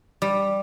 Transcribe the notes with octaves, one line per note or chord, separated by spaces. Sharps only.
G3